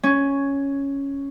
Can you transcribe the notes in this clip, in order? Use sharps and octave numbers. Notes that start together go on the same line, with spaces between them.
C#4